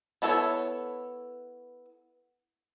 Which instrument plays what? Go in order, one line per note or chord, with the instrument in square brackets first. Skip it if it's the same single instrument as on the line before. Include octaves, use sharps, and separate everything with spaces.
[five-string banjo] B3 E4 A4 B4 C#5